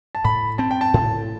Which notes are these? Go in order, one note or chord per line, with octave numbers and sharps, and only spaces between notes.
A5
A2 B5
C4 A5
G5
A5
A2